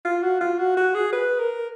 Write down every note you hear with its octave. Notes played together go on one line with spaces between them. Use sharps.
F4
F#4
F4
F#4
F#4
G#4
B4
A#4